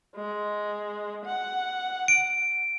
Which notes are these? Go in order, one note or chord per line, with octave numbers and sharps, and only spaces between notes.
G#3
F#5
D7